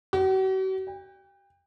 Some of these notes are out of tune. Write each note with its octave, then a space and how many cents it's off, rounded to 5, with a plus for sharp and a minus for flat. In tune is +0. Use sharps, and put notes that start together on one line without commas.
F#4 +45
G5 +30